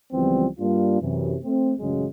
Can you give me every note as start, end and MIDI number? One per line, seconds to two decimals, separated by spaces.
0.13 0.47 37
0.13 0.47 52
0.13 0.47 53
0.13 0.47 55
0.13 0.47 59
0.13 0.47 60
0.59 0.99 43
0.59 0.99 55
0.59 0.99 58
0.59 0.99 62
0.59 0.99 65
1.01 1.36 42
1.01 1.36 48
1.01 1.36 52
1.44 1.73 57
1.44 1.73 60
1.79 2.07 33
1.79 2.07 42
1.79 2.07 49
1.79 2.07 54
1.79 2.07 56